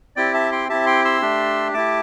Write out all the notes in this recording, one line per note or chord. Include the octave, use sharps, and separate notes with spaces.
C4 E4 G4 D5 G5
E5 A5
G5 C6
C4 E4 G4 E5 A5
G5 C6
C6 E6
A3 D4 G4
A3 E4 G4 A5 D6